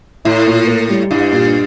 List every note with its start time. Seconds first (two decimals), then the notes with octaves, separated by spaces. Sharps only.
0.25 A2 E4
0.46 A#2
0.67 A#3
0.89 G3
1.10 G2 E4
1.32 A#2